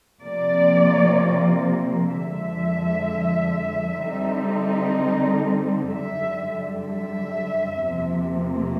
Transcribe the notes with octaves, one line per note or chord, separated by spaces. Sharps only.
C3 F3 A#3 D5
F2 D3 F3 G#3 E5
D3 G3 C4 D#4
F#2 D3 G3 E5
E5
E2 C3 F3 A#3